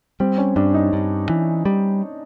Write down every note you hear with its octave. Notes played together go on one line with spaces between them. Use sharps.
G3 C4
C#4
G2 D4
D#4
G2
E3
G3